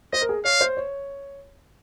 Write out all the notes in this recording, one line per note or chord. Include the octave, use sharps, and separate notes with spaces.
C5 D#5
A#4
G#4
C#5 F5
C5
C#5